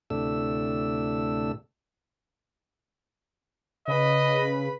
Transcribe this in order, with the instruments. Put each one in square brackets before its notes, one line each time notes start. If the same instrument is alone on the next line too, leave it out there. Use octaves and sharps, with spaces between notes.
[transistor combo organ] D2 A2 C3 A3 D4 E6
[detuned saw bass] C#3 [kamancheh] B4 B5 [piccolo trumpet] D#5